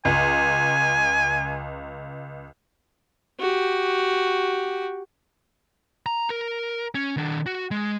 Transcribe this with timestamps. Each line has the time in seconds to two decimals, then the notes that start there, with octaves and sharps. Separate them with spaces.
0.05 C#2 G#5
3.40 F#4 G4
6.06 A#5
6.30 A#4
6.95 C#4
7.17 D#3 D4
7.46 F#4
7.71 G#3